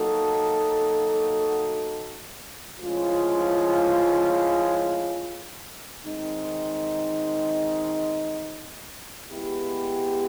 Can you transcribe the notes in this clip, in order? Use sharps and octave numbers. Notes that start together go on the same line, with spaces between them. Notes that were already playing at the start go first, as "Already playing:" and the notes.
Already playing: F#3 A#3 D#4 F#4 A4
A2 F3 G#3 C#4 F4
D#3 G#3 C4 D#4
G#3 B3 E4 G4